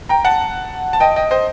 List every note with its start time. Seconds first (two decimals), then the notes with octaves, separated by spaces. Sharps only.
0.09 G5 A#5
0.25 F#5 A5
0.93 A5
1.00 D#5 G5
1.16 D#5 G5
1.31 C5 D#5